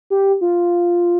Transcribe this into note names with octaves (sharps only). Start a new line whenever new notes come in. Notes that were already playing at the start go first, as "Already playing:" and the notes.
G4
F4